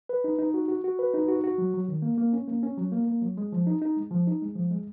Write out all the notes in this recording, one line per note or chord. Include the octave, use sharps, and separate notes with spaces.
B4
D#4
D#4
F#4
F#4
F#4
B4
D#4
F#4
F#4
F#3
F#3
D#3
A#3
A#3
C#4
A#3
C#4
F#3
A#3
A#3
F#3
G#3
F3
D#4
D#4
G#3
F3
D#4
G#3
F3
G#3